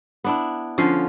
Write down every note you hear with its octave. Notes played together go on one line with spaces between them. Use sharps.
B3 D4 E4
D3 F3 C#4 F5